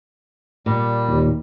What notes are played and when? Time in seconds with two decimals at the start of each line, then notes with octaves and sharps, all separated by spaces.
0.66 A#2 G3
1.08 D#2